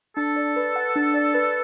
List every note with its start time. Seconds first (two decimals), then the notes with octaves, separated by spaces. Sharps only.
0.17 D4 A4
0.36 D5
0.56 B4
0.76 F#5
0.96 D4
1.14 D5
1.34 B4